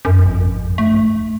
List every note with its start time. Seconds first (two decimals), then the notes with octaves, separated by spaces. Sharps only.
0.05 F#2
0.18 G#1 F2
0.78 G1 G#3 A3
0.93 G#2